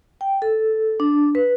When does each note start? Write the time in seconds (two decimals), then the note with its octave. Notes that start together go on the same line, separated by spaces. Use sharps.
0.21 G5
0.42 A4
1.00 D4
1.35 B4